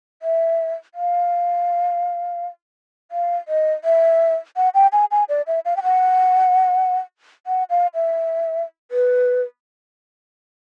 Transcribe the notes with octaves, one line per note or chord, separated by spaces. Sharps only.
E5
F5
F5
D#5
E5
F#5
G5
G#5
G#5
D5
E5
F5
G5
F#5
F#5
F5
E5
B4